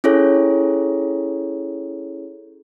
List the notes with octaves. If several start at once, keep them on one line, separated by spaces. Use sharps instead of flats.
C#4 E4 G#4 A4 C#5